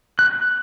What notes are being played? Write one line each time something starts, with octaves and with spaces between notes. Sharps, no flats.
F#6